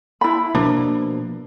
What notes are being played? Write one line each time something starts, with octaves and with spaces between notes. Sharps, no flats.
E4 B5
B2 F3 A#3 D4